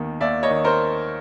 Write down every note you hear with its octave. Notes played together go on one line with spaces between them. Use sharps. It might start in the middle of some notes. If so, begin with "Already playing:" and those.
Already playing: D#2 D#3 B3
D#2 D5 E5
C#5 D#5
D#3
A#4 C5